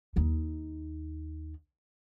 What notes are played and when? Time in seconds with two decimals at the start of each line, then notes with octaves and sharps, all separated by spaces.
0.16 D#2 D#4